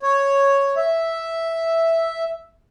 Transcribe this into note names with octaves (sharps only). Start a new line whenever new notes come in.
C#5
E5